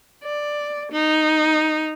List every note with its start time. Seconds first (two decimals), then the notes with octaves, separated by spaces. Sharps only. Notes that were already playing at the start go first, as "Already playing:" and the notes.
0.24 D5
0.92 D#4